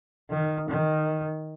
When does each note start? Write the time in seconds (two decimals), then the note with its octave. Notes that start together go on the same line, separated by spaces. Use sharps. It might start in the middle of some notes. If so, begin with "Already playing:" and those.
0.30 D#3
0.69 D#3